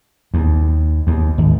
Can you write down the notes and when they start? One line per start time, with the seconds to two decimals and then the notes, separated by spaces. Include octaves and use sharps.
0.34 D#2
1.07 D#2
1.38 G#1